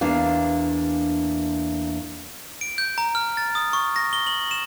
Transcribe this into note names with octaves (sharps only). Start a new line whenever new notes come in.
E2 A#3 D4 F5
D7
G6
A#5
F6
A6
D#6
C#6
A#6
G7
F#7
E7